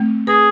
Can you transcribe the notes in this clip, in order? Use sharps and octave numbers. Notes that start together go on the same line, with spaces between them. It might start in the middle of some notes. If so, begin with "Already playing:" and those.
Already playing: A3 C4
G#4 B4